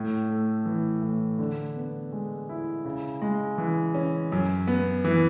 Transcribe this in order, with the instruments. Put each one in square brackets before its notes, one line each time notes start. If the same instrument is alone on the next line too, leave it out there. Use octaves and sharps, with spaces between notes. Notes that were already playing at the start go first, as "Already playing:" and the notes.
Already playing: [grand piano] A2
A3
E3
A2
D3
B3
G#3
E4
C#3
G#3
E3
C#4
F#2
B3
E3